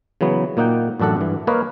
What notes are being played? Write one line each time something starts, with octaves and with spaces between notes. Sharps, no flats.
C#3 E3 F#3 B3
A#2 A#3 D#4 F#5 G5
A1 F#2 D4 A4 F#5
G2 E3
A#3 A#4 B4 C#5 D#5 F5